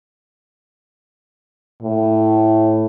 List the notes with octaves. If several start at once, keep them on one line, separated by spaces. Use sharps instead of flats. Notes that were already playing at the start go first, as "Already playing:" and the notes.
A2